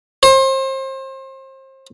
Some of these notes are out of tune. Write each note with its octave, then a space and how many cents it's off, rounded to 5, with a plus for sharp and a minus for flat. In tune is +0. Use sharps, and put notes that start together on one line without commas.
C5 +30